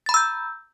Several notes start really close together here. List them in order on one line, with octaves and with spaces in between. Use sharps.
A6 B5 A#5 E6 G6